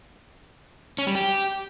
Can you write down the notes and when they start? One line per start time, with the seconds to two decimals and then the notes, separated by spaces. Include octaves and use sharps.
0.98 C#4
1.07 G3
1.15 G4